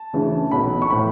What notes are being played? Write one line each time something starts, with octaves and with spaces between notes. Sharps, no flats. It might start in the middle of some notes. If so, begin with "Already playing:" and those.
Already playing: A5
D2 C#3 E3
B1 B2 B5
C#6
A2 E3 B5